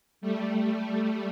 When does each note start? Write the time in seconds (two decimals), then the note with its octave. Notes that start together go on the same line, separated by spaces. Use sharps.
0.21 G3 A3